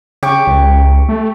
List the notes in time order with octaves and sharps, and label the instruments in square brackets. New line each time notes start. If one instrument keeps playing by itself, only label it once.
[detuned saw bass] C#3 [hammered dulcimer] G4 C#6 D6
[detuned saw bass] C#2
A3